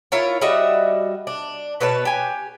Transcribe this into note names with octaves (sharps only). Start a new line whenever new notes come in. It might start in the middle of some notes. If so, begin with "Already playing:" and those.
E4 F4 A#4 C#5
G3 F#4 D#5 E5
D4
B2 B4 C#5 A5
G4 G#5